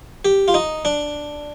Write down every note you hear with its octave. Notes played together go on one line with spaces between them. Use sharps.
G4
F4
D#4
D4